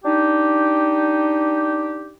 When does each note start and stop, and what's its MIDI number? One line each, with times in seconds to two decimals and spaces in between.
0.05 2.12 62
0.05 2.12 63
0.05 2.12 67